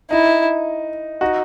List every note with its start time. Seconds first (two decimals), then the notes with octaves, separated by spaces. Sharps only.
0.10 D#4 E4
1.21 D#4 F#4